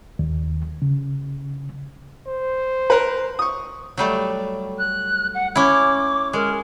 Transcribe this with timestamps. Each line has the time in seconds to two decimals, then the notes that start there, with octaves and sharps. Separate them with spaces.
0.19 D#2
0.82 C#3
2.27 C5
2.90 A#4 B4
3.39 C#6 D#6
3.97 F#3 G3 A3
4.78 F#6
5.34 F#5
5.56 C#4 E4 D6
6.33 G#3 A#4